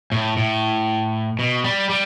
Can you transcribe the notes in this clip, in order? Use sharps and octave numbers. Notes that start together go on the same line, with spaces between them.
A2
A2
B2
G3
G3